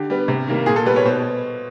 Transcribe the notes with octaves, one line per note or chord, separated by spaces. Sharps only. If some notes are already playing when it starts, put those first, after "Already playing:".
Already playing: D3 G4
G3 B3
C3
D#3 G3 A#3
A#2 G#4
A4
G3 B3 B4
C#5
B2 C5